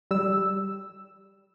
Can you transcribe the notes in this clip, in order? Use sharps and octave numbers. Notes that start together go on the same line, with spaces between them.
G3 E6